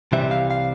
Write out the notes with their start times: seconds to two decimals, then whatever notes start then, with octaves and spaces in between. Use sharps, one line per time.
0.12 C2 C3 E3 G3 C4 E5
0.31 F5
0.51 F5